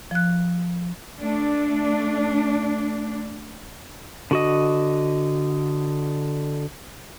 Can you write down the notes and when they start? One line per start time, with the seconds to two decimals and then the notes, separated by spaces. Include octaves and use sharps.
0.11 F3 F#6
1.19 A3 D4
4.31 D3 F#4 D#5